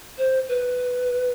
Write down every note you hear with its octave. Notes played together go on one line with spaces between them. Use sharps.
C5
B4